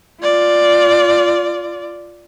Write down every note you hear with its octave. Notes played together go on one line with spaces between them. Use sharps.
F4 D5